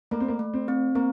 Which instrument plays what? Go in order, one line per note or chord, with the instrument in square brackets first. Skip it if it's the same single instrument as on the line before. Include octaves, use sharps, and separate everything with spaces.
[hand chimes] A3 [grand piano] A#3
[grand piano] C4
A#3
[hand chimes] A3
[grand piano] C4
[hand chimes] C4
[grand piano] A#3 [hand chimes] C4